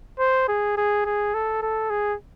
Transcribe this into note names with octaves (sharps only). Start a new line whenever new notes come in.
C5
G#4
G#4
G#4
A4
A4
G#4